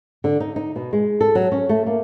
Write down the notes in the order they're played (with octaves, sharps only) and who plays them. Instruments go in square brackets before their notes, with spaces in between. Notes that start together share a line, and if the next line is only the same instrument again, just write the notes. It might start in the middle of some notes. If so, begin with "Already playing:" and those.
[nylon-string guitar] D3
D#4
D#4
B2
G#3
A4
F#3
C#4
A3
A#3